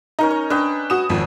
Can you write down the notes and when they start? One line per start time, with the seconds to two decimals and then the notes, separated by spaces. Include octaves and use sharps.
0.19 C#4 D#4 A#4 A#5
0.31 C#5
0.50 D4 B4 D#5 G5
0.90 F#4 D#6 E7
1.09 G#1 F2